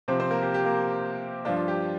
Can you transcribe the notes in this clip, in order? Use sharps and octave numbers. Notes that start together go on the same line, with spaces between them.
C3 F3 C4 C5
C4 C5
A#3 A#4
G4
G4
A#3 A#4
G2 F3 D4 F4
F4
G4